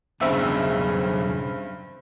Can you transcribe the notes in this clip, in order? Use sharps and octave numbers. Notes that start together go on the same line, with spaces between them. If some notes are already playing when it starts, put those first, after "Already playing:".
B1 E2 G2 C#3 C4 E5